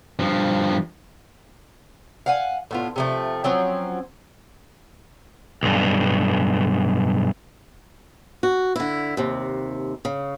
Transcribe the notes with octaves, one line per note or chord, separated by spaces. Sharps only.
G2 F3
F5 F#5 G#5
A2 B3 F4
C3 F3 A3
F3 F#3 C4 C#4
B1 G2
F#4
D3 E4
D#2 C3
C#3